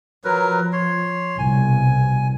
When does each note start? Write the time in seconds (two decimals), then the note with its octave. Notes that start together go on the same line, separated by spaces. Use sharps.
0.24 F3 F#3 A#4 B4
0.73 C#5 C6
1.39 C2 B2 G#5